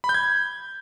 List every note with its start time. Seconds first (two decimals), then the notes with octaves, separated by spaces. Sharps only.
0.04 B5
0.09 G6
0.14 G#6